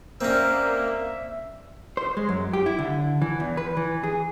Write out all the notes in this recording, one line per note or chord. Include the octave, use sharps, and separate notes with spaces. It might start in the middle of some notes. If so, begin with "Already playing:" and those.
A#3 C4 C#4 C5 D5 E5
C5
G#3
F#2
G4
E4
D3
E3
E2
B4
E3
G#4